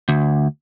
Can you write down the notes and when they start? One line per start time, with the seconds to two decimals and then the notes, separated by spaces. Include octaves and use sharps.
0.09 D2